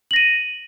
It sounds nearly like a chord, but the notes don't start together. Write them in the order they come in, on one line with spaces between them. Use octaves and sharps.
F#7 A#6 D#7